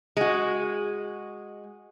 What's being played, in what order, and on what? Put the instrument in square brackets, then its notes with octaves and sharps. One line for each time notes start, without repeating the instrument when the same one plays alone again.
[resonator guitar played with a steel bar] G#3 F#4